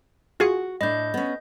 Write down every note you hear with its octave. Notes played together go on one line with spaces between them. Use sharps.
F4 F#4 G#4 C#6
A2 D4 D#5 G6
B3 C#4